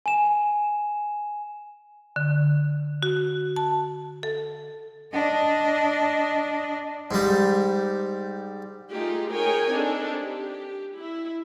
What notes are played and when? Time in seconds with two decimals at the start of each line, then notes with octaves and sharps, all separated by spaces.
0.06 G#5 E7
2.16 D3
3.03 F#4
3.56 A5
4.23 A4
5.13 D4 D#5
7.11 G#2 G3
8.93 A3 D#4 F4 G4 G#4
9.31 G#4 A#4 C#5 G5 G#5
9.71 C4 D4 D#4 A4
10.15 G4
10.97 E4